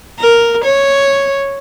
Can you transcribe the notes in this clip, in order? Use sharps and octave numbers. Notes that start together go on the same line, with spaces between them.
A#4
C#5